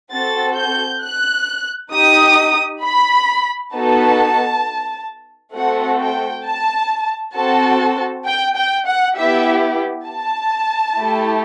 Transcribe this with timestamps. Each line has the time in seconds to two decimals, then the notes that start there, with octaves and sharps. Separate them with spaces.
0.11 C4 F#4 A4 A6
0.56 G6
1.02 F#6
1.92 D#4 G4 D#6
2.82 B5
3.73 B3 D#4 F#4 A4 A5
5.54 A3 C4 F#4 A4 F#5
6.00 G5
6.45 A5
7.35 C4 F#4 A4 A5
8.26 G5
8.56 G5
8.86 F#5
9.16 B3 E4 G4 E5
10.07 A5
10.98 A3 E4 G4